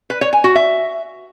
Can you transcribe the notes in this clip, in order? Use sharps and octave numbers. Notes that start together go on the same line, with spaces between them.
B4
C#5
G#5
F#4
E5